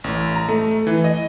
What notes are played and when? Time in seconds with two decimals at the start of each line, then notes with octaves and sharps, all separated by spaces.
0.04 A1
0.35 A#5
0.49 A3
0.87 E3
1.04 D#5